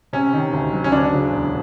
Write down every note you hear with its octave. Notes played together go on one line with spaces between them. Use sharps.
C3 C#4
D#3
D2
F#3
C#4
D2 D4
C#3
E1